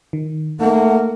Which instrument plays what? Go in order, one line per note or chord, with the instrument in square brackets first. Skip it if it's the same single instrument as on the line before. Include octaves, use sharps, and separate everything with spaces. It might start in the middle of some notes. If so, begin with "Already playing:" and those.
[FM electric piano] D#3
[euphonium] A3 [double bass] A#3 [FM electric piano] D#4 [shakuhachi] F#5